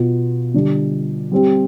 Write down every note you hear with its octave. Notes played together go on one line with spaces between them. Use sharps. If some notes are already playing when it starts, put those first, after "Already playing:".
Already playing: B2 B3 F4
D3 G3 D4
G3 C4 G4